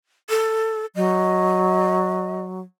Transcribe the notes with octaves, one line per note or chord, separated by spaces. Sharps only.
A4
F#3 D#5